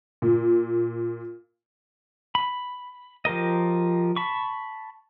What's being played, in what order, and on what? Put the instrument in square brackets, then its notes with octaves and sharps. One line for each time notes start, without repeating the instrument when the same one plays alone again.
[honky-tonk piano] A#2
[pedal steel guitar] B5
F3 G4 A#4 D#5
A5 B5 C#6